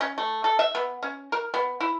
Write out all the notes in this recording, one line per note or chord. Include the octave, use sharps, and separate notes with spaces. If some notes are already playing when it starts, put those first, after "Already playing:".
C#4
A3
A4
E5
B3
C#4
A#4
B3
E4